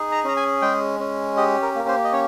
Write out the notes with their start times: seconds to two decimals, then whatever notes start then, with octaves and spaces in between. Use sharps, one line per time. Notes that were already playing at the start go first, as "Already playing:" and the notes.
Already playing: D#4 G#4
0.12 A#5
0.24 C#4 A#5
0.37 G#5
0.62 G#3 G5
1.00 C#4
1.37 G4 D#5
1.62 A#4
1.75 A#3 A#4
1.88 C5
2.04 D#5
2.12 C#4 C#5